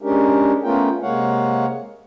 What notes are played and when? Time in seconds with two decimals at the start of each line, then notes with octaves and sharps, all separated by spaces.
0.02 G#3 C#4 D4 G4 A#4
0.64 A3 B3 C#4 F4 A#4 G5
1.02 C3 G#3 A#3 C#5 F5 F#5